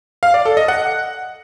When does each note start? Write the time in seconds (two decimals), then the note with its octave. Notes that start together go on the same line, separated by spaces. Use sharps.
0.23 F5
0.34 D5
0.46 A4
0.57 D#5
0.68 F#5